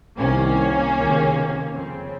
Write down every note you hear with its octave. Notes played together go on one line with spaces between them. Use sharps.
C2 C3 D#3 A#3 C#4
C#2 C3 D#3
F2 C#3 C4